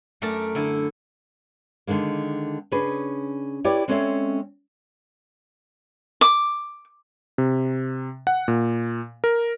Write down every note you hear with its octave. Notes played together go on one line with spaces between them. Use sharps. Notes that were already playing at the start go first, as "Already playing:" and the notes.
F#2 A3 A#4 D5 A5
D3 E4 A4
D3 D#3 G#3 A#3
C#3 C#4 D4 G#4 B4
E4 G4 B4 C#5 D5
G#3 C4 C#4 A4 C#5 E5
D6
C3
F#5
A#2
A#4